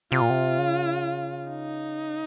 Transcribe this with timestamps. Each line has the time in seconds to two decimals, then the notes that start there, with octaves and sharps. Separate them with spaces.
0.12 C3 F4
0.21 A#2
0.30 C3
0.58 C#3
1.50 D#4